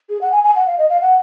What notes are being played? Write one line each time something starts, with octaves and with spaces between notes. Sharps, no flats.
G#4
F#5
G#5
G#5
F#5
F5
D#5
F5
F#5